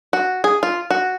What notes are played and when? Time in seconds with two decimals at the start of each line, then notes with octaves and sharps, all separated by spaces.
0.13 F#4
0.44 G#4
0.63 F4
0.90 F#4